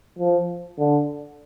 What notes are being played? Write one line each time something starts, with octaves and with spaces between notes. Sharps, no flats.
F3
D3